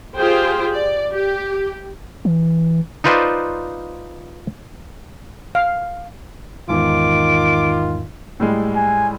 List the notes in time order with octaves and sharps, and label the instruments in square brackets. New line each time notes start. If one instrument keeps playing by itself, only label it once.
[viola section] F4 G4 G#4 C5 G5
D5
G4
[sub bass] E3
[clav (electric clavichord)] D#4 F4 B4 C5 D5
[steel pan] F5
[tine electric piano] E2 G#2 [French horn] D#3 [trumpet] F4 [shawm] D6
[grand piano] A2 G3 G#3
[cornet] G#5